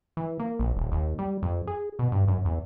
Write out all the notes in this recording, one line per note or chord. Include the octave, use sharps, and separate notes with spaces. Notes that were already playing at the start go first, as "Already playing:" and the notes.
E3
A#3
A#1
D#1
D#2
G3
F2
G#4
B2
G2
F#2
E2